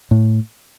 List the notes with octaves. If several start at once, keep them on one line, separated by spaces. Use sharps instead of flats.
A2